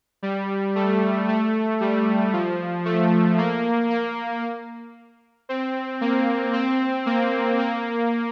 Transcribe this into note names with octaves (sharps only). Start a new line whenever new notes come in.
G3
A3
A3
G3
F3
A3
A#3
A#3
C4
A#3
C4
A#3
A#3